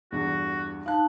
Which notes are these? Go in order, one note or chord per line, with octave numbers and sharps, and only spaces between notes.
E2 G2 F#4
D#4 F5 A5 F#6